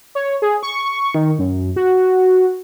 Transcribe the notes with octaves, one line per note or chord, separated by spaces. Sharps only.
C#5
G#4
C#6
D#3
F#2
F#4